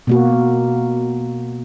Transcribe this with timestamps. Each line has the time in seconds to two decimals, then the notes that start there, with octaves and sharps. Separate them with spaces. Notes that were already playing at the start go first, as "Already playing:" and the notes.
0.07 B2 A#3 F#4